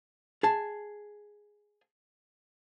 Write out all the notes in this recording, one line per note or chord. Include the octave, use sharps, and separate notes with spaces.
G#4 A5